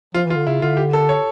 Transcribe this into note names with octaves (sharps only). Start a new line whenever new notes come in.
F3 F4
E3
F4
D3
C#3 E4
D3 F4
G4
A4
C#5